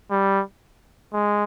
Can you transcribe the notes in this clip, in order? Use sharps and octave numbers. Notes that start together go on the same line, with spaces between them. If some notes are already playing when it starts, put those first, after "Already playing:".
G3
G#3